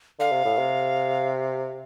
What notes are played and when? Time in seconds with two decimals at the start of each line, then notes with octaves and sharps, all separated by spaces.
0.19 D3 F5
0.32 C3
0.45 A2
0.57 C3